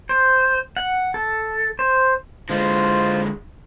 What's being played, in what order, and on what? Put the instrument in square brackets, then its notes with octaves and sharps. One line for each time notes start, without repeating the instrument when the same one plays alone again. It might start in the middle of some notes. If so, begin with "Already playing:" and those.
[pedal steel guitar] C5
F#5
A4
C5
[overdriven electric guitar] D3 G#3 [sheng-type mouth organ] F4 C5